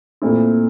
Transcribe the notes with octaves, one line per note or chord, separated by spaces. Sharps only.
A#2 A3 C4 E4